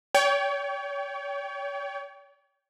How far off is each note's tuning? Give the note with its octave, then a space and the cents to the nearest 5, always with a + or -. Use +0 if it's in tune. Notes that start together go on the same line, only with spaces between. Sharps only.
C#5 +35 G5 +0